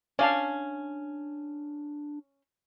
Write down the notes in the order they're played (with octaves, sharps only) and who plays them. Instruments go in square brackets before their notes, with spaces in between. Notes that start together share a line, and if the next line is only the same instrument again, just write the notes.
[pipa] C#4 [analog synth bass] D4 [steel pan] D5 F5 A5